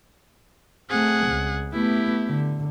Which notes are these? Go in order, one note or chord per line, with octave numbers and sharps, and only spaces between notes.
A3 C4 G#4 F#5
C#2
A3 B3 E4 G4
D3